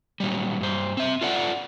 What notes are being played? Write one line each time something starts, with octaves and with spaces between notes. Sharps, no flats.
A#2 F#3 G3
G2 C5
C4 E5
F4 A4 D5 F#5